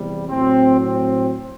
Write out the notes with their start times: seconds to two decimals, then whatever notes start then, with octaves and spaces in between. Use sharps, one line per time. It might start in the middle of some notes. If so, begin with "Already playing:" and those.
Already playing: E2 C3 G3
0.29 A2 F#3 C4
0.80 C4